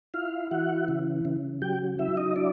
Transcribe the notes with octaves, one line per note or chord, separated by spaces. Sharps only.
E4 F4 F5
E3 F#4 F#5
C#3
C#3
F#3 G4 G5
F#3 E4 E5
D#4 D#5
D4 E4 D5